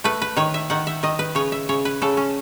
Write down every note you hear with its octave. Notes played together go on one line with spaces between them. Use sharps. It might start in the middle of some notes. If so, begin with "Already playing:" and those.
A3 B4
B4
D#3 C#5
E5
D#3 F#5
E5
D#3 D#5
B4
C#3 C#5
E5
C#3 C#5
B4
C#3 A4
C#4